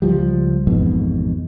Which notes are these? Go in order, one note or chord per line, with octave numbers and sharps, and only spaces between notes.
C#2 F3 G3
A1 F2 G#2 B2